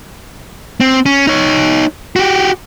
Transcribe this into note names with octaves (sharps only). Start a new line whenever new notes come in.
C4
C#4
D#4 C#5
F#4 G4